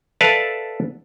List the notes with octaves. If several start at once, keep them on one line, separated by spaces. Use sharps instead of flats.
A4 B4 D5 E5 F5 A5